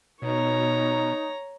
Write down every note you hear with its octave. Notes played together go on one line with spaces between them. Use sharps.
B2 D#4 C#5 A#5